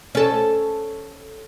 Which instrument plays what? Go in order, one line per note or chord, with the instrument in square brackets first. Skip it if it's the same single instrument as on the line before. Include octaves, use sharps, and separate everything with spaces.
[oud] C#4 A4